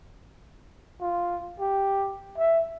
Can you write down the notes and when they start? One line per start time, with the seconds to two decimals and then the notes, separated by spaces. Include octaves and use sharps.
1.00 F4
1.60 G4
2.38 E5